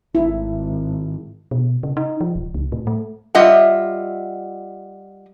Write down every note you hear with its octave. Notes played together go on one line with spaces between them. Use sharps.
G#1 E4
B2
C#3
D#4
F3
D#1
C#2
A2
A3
G3 F4 D#5 E5 F#5